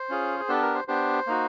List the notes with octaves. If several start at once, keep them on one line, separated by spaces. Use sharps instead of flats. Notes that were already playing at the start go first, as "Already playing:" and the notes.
Already playing: C5
C#4 F4 G#4
G#4
B3 D4 G4 A4
A#4
C5
B3 D4 G4 C5
A#3 D#4 F#4